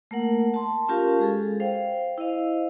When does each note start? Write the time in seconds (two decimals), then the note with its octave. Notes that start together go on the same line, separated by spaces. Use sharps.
0.11 A3 A#3 A#4 F#5
0.54 A5 C6
0.88 C#4 F4 G4 A#4 F5 A5
1.19 G#3 G#4 A4
1.60 C5 F5 G5
2.18 E4 C5 D#5 F5